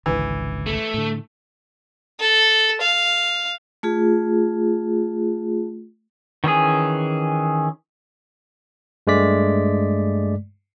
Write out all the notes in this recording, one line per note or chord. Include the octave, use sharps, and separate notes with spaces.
G#1 C#2 D3 E3
A3
A2 D3
A4
F5
A3 F4 G#4
D#3 E3 C#4 G#4
G2 G#3 A3 D5 B6